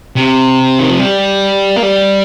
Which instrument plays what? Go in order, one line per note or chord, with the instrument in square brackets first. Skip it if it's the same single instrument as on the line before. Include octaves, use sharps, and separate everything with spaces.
[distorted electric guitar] C3
D#3
F3
G3
A#3
G3